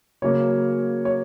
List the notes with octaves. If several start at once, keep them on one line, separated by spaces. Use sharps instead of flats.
C#3 F#3 A#3 C#4 C#5
C#5